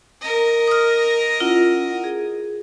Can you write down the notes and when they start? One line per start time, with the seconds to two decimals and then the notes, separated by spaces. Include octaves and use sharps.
0.21 A#4 D#5
0.68 D#6 F6
1.40 C#4 E4 F4 F#5
2.04 G#4